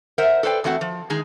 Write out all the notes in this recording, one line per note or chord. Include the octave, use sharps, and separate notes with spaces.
A#4 C5 E5 F#5
A4 B4 C5 D5 G5
E2 A3 C4 F#4 F#5
F3
D#3 G#3 D#4 G#4